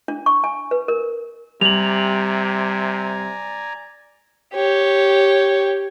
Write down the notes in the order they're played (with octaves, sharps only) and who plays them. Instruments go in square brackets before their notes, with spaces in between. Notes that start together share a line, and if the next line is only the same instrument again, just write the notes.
[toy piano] D4
C#6
G#5
B4
A#4
[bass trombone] C3 [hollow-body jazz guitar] G3 [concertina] D5 G#5 A#5 [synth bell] F7 F#7
[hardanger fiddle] G4 C#5